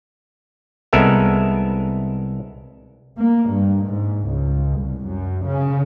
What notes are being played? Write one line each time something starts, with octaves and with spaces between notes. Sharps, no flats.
C2 G#3 B3 A4 A#4 E5
A#3
G2
G#2
C#2
C2
F#2
C#3